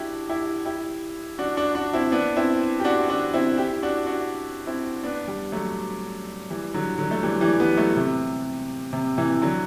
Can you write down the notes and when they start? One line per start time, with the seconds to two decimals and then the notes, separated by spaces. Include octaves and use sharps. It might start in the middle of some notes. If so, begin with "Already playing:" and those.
Already playing: D4 E4 F#4 G4
0.29 E4 G4
0.65 E4 G4
1.38 D4 F#4
1.57 D4 F#4
1.75 D4 F#4
1.94 C4 E4
2.12 B3 D4
2.36 C4 E4
2.80 G4
2.85 D4 F#4
3.09 D4 F#4
3.34 C4 E4
3.58 E4 G4
3.83 D4 F#4
4.07 D4 F#4
4.67 C4 E4
5.04 B3 D4
5.28 G3 B3
5.52 F#3 A3
6.50 E3 G3
6.74 D3 F#3
6.98 D3 F#3
7.11 A3
7.23 E3 G3
7.41 E3 G3
7.59 G3 B3
7.77 F#3 A3
7.96 C3
8.93 C3
9.18 C3 E3
9.42 D3 F#3